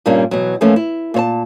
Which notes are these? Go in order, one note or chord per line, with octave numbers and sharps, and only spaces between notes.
G2 A#2 G3 A#3 C#4 D4
B2 E3 F#3
E3 F3 A3 A#3 C#4
E4
A#2 C#5 A5